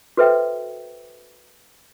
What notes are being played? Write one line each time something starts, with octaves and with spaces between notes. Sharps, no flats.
F#4 A4 B4 C5 E5 G5